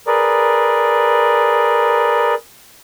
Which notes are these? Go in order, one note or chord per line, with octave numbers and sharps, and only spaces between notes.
G#4 A#4 B4 D5